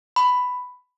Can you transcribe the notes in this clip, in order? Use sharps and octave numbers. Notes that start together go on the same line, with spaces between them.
B5